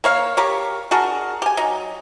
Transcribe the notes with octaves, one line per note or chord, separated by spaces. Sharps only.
A#3 C#5 F5
G4 A#4 C#5
D4 F#4 G#4 A#4
G4 G#5
F#3 D#4